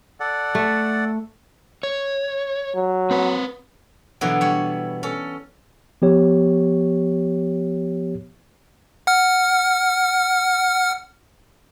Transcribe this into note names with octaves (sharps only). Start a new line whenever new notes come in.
A4 D5 F#5
A3
C#5
F#3
C4 B4
B2 D3 E3 F#3 B3
G3 C#5
C#4 A4
F3 B3 G4 C#5
F#5 F6